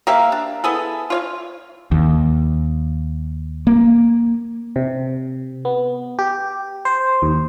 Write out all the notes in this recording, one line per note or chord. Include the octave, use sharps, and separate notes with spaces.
A#3 G4 E5 F5
D4
B3 E4 G#4 A4
F4 C#5 F5
D#2
A#3
C3
B3
G4
C5
D#2